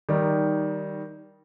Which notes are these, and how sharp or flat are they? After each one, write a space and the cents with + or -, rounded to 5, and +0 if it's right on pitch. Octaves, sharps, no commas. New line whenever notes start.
D#3 +5 G3 -10 D#4 -5